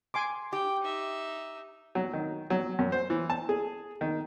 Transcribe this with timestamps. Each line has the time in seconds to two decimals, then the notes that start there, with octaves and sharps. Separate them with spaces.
0.14 G#5 C6 D6
0.53 G4 G5
0.82 D#4 E5
1.95 F#3
2.13 D#3
2.50 F#3
2.79 F#2
2.92 C5
3.10 E3
3.30 A5
3.49 G#4
4.01 D#3